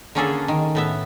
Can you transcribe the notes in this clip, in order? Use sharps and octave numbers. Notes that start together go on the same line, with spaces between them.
D3 A#3 C#4 D4 G#4 A4
D#3
A2 B3 E5